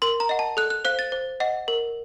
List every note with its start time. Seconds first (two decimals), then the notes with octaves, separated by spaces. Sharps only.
0.02 A#4 C6
0.20 A#5
0.29 D#5 F#5
0.39 A5
0.57 A4 F#6
0.70 F#6
0.85 C5 F5 F#6
0.99 A6
1.12 C5
1.40 D#5 F#5
1.68 A#4